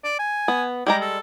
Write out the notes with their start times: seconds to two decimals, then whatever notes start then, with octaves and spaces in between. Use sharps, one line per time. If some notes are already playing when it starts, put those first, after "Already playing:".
0.04 D5
0.19 G#5
0.48 B3
0.86 G3 G#3 G4 A#5
1.01 A4